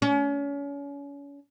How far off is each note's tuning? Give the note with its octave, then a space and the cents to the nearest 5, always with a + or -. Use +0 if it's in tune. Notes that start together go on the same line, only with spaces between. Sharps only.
C#4 +35